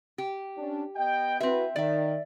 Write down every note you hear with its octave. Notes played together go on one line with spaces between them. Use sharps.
G4
C#4 D4
B3 D#5 G5
C4 E4 F#4 B4 E5
D#3 D5 E5